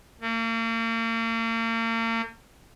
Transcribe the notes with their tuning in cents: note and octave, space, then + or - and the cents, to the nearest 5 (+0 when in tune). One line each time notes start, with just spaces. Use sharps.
A#3 -40